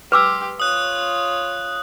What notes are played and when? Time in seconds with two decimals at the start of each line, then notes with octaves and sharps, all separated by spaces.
0.12 G4 B4 C6 D6 E6
0.60 F4 C#5 D#6 F#6